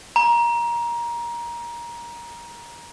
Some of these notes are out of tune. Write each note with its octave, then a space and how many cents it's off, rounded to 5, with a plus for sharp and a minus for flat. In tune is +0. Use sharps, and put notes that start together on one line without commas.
A#5 +20